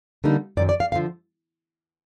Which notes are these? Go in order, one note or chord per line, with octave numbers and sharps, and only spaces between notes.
D3 G3 A#3 D#4
F#2 D#3 F#3 D5
D5
F5
D3 F3 F5